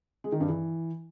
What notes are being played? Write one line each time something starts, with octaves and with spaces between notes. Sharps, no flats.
G#3
D#3
G2
E3